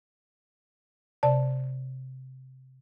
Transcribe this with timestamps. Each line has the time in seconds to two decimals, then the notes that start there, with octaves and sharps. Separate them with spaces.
1.23 C3 D5 A5